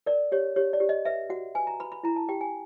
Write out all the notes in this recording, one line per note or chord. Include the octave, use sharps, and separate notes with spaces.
A#4 D5
G4 C#5
G4 C#5
D5
G4
D#5
B4 E5
F#4 F#5
B4 G#5
A#5
B4 B5
B5
E4 A#5
A5
G4 G5
G#5